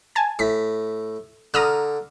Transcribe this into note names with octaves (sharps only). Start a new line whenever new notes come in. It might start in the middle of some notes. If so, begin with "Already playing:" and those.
G#5 A5 G#6
A2 B6
D3 A#5 D#6 F6